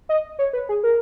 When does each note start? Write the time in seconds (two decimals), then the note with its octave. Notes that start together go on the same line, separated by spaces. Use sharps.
0.09 D#5
0.39 C#5
0.53 B4
0.69 G#4
0.84 A#4